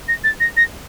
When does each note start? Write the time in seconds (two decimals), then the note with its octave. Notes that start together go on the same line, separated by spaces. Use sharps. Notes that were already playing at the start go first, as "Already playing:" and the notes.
0.08 A#6
0.24 A6
0.40 A#6
0.57 A#6